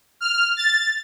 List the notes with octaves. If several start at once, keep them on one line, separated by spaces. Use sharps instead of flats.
F6
A6